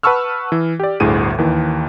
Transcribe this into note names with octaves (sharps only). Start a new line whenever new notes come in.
B4 F#5 A5 C#6 E6 F6
E3
G4 D5
G1 D2 A2 G#4 D#7
D#2 D#3 E3